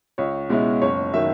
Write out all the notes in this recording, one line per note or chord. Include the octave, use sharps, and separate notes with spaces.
C#2 C#5
B2 G#3 C#4 E4
F#1 C#5
D#3 F#3 E5